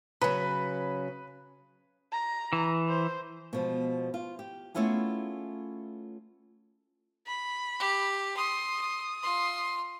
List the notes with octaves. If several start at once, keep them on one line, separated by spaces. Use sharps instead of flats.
C#3 F#3 B4
A#5
E3
C5
B2 F3 G#3
F4
G4
A3 B3 C#4 E4 F4 G#4
B5
G4
C6 D#6
D#6
F4 C6